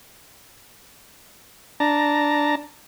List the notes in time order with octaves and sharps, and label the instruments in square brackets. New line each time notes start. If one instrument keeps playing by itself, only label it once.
[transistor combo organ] D4 A5 A#5